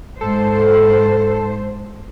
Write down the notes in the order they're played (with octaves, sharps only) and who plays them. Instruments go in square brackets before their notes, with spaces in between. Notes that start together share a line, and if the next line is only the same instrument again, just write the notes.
[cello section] G#2 C5 [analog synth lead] A4